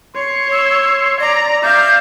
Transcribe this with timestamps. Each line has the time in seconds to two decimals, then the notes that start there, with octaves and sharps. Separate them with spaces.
0.16 C#5 C6
0.52 E6
1.20 D5 A#5
1.63 D5 E5 F5 G6